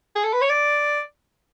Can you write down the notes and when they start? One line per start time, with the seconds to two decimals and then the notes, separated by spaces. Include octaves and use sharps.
0.16 G#4
0.24 A4
0.33 B4
0.41 C#5
0.50 D5